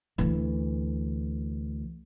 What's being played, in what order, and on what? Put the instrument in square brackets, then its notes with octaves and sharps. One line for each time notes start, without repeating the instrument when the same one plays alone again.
[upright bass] D2 E3